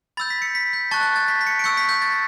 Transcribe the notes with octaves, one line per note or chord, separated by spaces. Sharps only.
B5 E6 G6 A6
B6
C#7
B6
G6
A5 C#6 F#6 A6
G6
A6
B6
B6
C#7
D7
C#6 E6 G6 C#7
B6
G6
A6